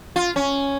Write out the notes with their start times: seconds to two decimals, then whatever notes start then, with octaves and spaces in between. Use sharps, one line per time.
0.16 F4
0.36 C#4